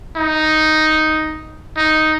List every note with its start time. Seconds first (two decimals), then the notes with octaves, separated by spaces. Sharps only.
0.16 D#4
1.77 D#4